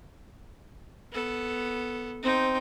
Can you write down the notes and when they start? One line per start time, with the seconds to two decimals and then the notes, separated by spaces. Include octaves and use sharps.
1.12 B3 A4
2.23 C4 D#4 G5